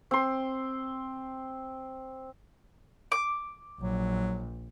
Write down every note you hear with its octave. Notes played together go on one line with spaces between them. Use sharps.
C4 C6
D6
A#1 F#3